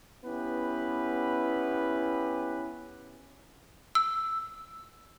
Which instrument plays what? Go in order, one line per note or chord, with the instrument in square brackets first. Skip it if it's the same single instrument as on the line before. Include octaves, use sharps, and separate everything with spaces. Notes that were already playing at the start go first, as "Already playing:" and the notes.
[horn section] B3 C#4 E4 G4 B4
[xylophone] E6